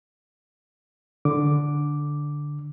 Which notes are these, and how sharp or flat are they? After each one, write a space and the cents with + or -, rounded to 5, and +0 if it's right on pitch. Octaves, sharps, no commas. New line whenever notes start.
D3 +0 D6 +0